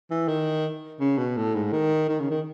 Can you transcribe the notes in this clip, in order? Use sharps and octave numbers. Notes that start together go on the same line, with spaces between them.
E3
D#3
C#3
B2
A2
G#2
D#3
D#3
C#3
D#3